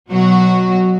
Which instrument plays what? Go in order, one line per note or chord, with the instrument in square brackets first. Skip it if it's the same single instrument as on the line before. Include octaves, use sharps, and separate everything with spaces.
[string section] B2 F#3 F#4